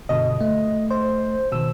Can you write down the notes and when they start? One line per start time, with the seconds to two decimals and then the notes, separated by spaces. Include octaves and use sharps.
0.09 G2 B2 D3 D#5
0.41 A3
0.90 C5
1.52 B2 D#3 E6